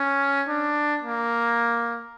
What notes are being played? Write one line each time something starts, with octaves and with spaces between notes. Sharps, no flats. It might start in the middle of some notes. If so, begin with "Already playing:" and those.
Already playing: C#4
D4
A#3